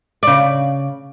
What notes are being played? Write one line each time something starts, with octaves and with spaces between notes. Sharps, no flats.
C#3 D5